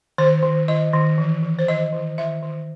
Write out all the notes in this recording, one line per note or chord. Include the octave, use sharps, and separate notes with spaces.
D#3 C5
D#3
D#3 D#5
D#3
E3
E3
C5
D#3 D#5
D#3
D#3 E5
D#3